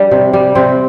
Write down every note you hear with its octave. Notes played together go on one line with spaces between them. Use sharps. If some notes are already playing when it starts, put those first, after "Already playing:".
Already playing: G3 D4
C3
G3
C3 C4